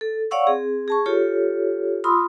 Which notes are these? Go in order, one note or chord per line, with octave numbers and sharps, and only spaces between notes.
A4
C#5 D5 F5 F#5 C#6 E6
C4 G#4
G#4 A5 C#6
F4 G4 A4 C#5
F4 B5 C6 D#6 E6